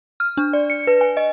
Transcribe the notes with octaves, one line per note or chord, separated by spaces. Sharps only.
F6
D4
D5
C#7
B4
G#5
D#5